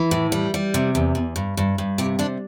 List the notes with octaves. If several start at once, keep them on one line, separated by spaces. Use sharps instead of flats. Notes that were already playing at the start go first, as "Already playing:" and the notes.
Already playing: E3
A2
G3
G3
C3
E2
E2
G2
G2
G2
C3 G4
C3 D4